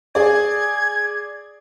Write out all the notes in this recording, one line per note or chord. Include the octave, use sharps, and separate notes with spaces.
G#4 D5 G#6